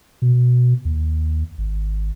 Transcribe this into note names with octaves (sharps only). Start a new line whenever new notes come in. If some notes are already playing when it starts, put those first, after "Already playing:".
B2
D#2
G#1